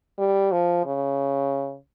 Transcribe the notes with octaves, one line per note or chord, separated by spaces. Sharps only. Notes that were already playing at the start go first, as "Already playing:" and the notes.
G3
F3
C#3